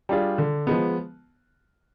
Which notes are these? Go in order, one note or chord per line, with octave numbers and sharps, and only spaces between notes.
G3 D4 F4 G#4
D3
F3 G#3 B3